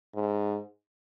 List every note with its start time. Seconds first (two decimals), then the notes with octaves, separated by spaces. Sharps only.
0.15 G#2